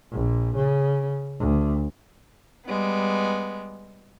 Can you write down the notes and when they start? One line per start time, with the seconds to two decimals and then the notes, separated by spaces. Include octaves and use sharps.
0.11 A#1
0.56 C#3
1.39 D2
2.66 G3 G#3 B3